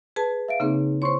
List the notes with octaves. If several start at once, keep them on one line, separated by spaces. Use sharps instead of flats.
G#4 B4 A5
E5 F5 D7
C#3 A#3 C4 D#4 G#4
E4 C5 C#5 C6 C#6